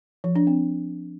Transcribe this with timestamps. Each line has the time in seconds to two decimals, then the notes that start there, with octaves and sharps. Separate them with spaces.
0.24 F3
0.35 D4
0.47 C4